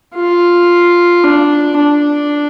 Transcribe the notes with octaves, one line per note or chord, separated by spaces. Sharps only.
F4
D4
D4